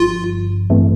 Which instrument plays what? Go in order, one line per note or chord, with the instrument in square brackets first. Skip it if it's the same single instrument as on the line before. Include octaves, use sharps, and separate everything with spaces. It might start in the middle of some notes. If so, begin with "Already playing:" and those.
Already playing: [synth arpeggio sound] G1 G2 F3 [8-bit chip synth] F4
[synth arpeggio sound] A1 G2 E3 A3 C4